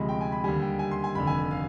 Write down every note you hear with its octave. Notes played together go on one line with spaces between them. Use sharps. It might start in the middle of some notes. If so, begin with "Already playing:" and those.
Already playing: D2 C3 F3 G#3 B5
G5
G#5
B5
D#2 D3 G3 G#5
G5
G#5
C6
G#5
F1 D#2 D3 B5
G#5
F5